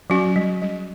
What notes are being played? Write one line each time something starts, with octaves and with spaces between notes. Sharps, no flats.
F#3 C#4 F#4
G3
G3